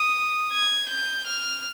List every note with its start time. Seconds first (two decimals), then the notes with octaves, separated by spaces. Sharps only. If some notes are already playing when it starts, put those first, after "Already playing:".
Already playing: D#6
0.53 G#6
0.89 G6
1.27 F6